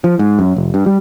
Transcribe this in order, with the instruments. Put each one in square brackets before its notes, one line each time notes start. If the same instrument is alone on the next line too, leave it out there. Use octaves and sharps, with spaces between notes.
[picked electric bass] F3
G#2
F#2
F1
G2
G3